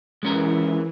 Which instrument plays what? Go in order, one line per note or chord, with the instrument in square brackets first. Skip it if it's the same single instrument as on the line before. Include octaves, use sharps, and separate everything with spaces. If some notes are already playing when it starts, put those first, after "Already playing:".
[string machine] E3 [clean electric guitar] G#3 C#4 A#4